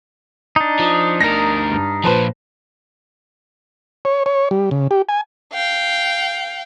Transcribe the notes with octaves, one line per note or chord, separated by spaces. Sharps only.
D4 D#4
F3
D2 A#4 A#6
G2
A#2 F3 B4 C5 A5
C#5
C#5
G3
C#3
G4
G#5
F5 G5